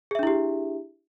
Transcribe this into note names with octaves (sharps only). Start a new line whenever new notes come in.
D4 E4 G4 G#4 E5